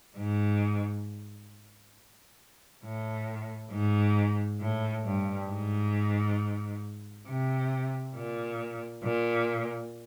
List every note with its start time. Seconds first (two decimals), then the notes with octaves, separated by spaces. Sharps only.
0.17 G#2
2.84 A2
3.72 G#2
4.60 A2
5.05 G2
5.49 G#2
7.27 C3
8.16 A#2
9.03 A#2